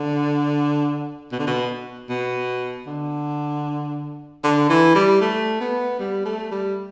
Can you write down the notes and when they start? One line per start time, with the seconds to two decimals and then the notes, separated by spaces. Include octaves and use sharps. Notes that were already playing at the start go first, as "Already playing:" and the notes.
Already playing: D3
1.32 B2
1.39 D3
1.47 B2
2.09 B2
2.87 D3
4.44 D3
4.69 E3
4.95 G3
5.21 A3
5.61 B3
6.00 G3
6.25 A3
6.51 G3